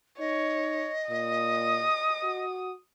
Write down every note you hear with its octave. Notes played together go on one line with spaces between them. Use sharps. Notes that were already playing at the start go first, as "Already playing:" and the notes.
D#4 C#5 D#5
A#2 D#6
F#4